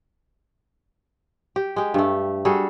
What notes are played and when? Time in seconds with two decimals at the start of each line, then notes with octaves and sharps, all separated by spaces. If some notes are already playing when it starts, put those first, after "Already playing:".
1.56 G4
1.76 G#3 G4
1.94 G2 A3
2.45 G3 F#4 G#4 A4